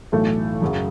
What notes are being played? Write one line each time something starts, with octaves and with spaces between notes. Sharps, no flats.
B1 A2 E3 A3
F#2 C#3 F#3